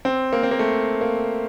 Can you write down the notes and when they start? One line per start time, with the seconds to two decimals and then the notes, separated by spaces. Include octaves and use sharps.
0.05 C4
0.33 A#3
0.43 C4
0.51 A#3
0.59 A3
1.01 A#3